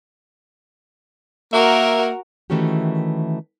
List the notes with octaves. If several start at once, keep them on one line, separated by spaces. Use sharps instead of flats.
A#3 F#4 A#4 E5
D#3 E3 A3 C#4 F#4 G4